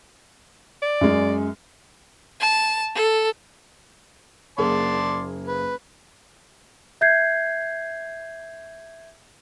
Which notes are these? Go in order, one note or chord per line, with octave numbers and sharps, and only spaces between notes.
D5
F#2 G#3
A5
A4
F#1 A#3 G#4 D5 A5 C6
B4
E5 G6 G#6 C7